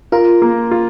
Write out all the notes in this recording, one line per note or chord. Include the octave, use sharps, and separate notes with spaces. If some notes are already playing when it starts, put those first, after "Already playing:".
F4 A#4
A#3
F4